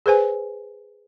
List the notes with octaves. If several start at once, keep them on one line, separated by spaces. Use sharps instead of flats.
G#4 B4 C5 G#5